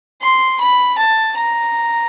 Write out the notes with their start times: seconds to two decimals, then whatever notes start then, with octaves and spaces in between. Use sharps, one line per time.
0.22 C6
0.60 B5
0.98 A5
1.36 A#5